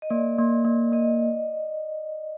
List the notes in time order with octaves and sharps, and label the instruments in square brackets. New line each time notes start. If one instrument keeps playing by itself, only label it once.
[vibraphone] D#5
[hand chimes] A#3 [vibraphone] D5
[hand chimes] A#3
A#3
[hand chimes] A#3 [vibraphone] D#5